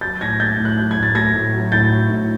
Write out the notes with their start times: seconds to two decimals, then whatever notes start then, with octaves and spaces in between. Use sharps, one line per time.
0.01 F#3 G6 A6
0.21 A2 G#6 A#6
0.40 A3 G6 A6
0.58 A2
0.65 F#6
0.78 F#3 G6
0.91 G#6
0.97 A2
1.03 A6
1.15 A3 G#6 A#6
1.34 A2
1.53 F#3
1.72 A2 G6 A6
1.90 A3
2.10 A2